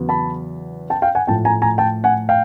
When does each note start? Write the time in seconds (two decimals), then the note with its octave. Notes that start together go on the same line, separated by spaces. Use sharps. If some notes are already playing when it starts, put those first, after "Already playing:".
Already playing: E2 C#3 F#3 B3
0.09 A5 B5
0.90 G5 A5
1.02 F5 G5
1.15 F#5 G#5
1.27 A2 F3 A3 G5 A5
1.45 G#5 A#5
1.62 G#5 A#5
1.78 G5 A5
2.04 F#5 G#5
2.29 F5 G5